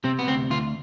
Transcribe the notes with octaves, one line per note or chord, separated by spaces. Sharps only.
C3 C4
B3
D2 C4
D2 F4